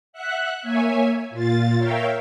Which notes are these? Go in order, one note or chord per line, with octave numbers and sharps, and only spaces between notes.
E5 F#5 F#6
A#3 C#5 E5 G#5
A#2 F4 A6
A#4 C#5 E5 F5 G5